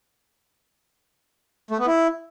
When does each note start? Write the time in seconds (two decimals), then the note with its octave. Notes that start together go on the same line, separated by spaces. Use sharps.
1.71 A3
1.78 B3
1.86 E4